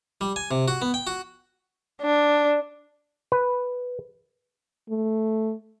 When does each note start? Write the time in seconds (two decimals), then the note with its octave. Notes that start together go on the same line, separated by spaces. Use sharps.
0.21 G3
0.36 G#5
0.51 C3
0.68 F#4
0.82 B3
0.94 G5
1.07 F#4
2.02 D4
3.32 B4
4.90 A3